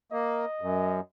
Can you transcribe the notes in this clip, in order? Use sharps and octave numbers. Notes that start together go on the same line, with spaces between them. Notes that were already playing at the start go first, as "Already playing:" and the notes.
A#3 D#5
F#2